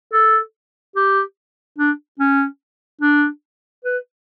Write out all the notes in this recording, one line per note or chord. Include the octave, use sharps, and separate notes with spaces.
A4
G4
D4
C#4
D4
B4